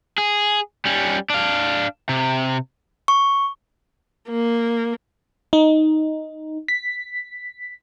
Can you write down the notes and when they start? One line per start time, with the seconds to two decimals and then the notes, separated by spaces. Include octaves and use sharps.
0.18 G#4
0.85 G3 C#4
1.30 D4 F5
2.09 C3
3.08 C#6
4.30 A#3
5.53 D#4
6.68 B6